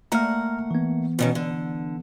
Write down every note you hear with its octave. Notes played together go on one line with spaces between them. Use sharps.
A3 A#3 F#5 A#5 F6
E3 B3
B2 D#3 C#4
D3